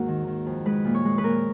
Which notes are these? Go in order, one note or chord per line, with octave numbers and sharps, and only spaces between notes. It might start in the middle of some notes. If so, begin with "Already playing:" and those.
Already playing: D#2 G#2 A#3 D#4 F#4 A#4
D#3
D#3
F2
G#3 B4
A#2
C#5
G#3
B4
A#2 A#4